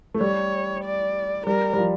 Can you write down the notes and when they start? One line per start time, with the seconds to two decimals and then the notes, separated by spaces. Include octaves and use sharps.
0.14 A3
0.21 G3 C#5
0.84 D5
1.47 G3 A#4
1.73 G3
1.78 F3